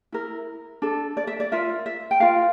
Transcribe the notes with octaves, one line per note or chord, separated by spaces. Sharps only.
E4 A#4
D4 A4
D5
E5
D5
F4 A#4 E5
E5
G5
F4 A#4 F5